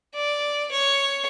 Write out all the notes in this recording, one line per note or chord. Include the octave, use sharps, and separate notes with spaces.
D5
C#5